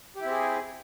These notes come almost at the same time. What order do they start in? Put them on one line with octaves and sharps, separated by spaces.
G4 E4 C4 G#4